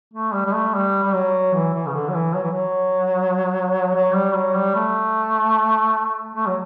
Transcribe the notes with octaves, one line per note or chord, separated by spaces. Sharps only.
A3
G3
G3
A3
G3
G3
F#3
E3
E3
C#3
D3
F#3
E3
F#3
E3
F#3
F#3
G3
F#3
G3
A3
A3
F#3